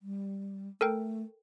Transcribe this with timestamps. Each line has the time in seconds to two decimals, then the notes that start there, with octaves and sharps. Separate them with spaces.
0.01 G3
0.81 A3 A4 A#4 G5